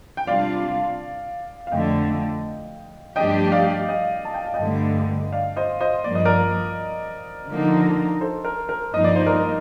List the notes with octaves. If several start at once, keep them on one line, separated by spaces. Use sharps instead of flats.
G5
C3 G3 D4 F4 D5 F5
F5
F2 D3 A3 D#5 G5
G2 F3 A3 D4 G4 D#5 G5
D5 F5
D#5 G5
A5
G5
F5
D#5 G5
G2 D3 A3
D5 F5
C5 D#5
C5 D#5
G2 F3 A#3 D5
D#5
A#4 D5
D3 F3 A#3 D#4
A4 C5
A#4
A#4
G2 F3 A#3 D#4 D#5
D5
C5
A#4 D5